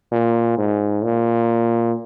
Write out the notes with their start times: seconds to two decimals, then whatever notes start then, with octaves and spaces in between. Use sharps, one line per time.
0.12 A#2
0.58 G#2
1.04 A#2